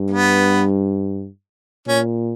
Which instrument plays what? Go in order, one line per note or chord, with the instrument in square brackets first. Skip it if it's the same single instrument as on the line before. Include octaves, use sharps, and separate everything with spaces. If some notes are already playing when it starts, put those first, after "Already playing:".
Already playing: [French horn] G2
[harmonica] B3
[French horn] A#2 [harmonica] C#4